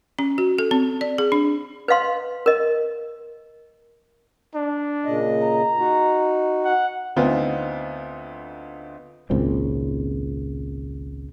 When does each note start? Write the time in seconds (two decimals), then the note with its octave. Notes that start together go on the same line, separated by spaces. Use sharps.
0.19 C#4
0.38 F#4
0.58 A4
0.71 C4
1.01 D5
1.18 G#4
1.32 D4
1.88 B4 D#5 F5 C6
2.46 A#4 D#5
4.55 D4
5.05 A#2 C#3 D#5
5.43 A#5
5.78 D#4 F#4
6.65 F#5
7.16 D2 B3 C4 D#4 F4
9.30 G#1 C#2 A#2 C4